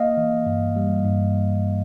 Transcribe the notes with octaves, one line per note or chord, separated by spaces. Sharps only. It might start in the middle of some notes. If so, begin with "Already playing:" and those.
Already playing: A#3 D#5 F5
E3
G2
G3
G2